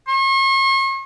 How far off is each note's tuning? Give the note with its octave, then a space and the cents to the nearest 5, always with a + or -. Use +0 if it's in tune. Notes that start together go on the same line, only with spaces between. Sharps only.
C#6 -45